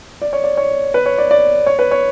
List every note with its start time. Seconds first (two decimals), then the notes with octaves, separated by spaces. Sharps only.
0.22 D5
0.33 C#5
0.44 D5
0.57 C#5
0.94 B4
1.06 C#5
1.18 D5
1.31 D5
1.66 C#5
1.79 B4
1.91 C#5